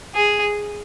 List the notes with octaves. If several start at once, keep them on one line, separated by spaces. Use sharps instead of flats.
G#4